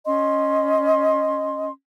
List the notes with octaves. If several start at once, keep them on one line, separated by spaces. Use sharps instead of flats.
C#4 D#5 C6